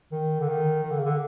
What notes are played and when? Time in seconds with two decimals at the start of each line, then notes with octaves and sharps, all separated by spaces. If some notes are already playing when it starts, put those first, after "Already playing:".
0.12 D#3
0.40 D3
0.48 D#3
0.83 D#3
0.90 D3
0.98 C#3
1.05 D3